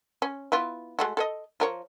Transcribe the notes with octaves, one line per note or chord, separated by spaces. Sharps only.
C#4
B3 E4 F4
G#3 A3 F#4
A4 B4 D#5
F3 A#4 C#5